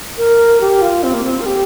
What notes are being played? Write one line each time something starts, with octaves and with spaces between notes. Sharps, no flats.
A#4
G4
F4
C4
A#3
C4
A#4
G4